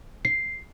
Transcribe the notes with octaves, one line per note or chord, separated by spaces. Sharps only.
C7